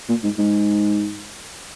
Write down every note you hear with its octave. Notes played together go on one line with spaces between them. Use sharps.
A#2
G#2
G#2